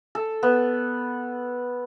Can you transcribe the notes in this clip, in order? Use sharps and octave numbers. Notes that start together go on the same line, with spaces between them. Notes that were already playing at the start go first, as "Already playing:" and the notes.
A4
B3